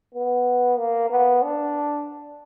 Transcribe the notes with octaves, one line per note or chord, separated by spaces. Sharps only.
B3
A#3
B3
D4